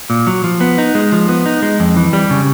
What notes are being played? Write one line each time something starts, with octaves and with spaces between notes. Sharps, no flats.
A#2
F#3
F3
B3
D#4
G#3
F3
B3
D#4
G#3
F2
E3
G3
C#3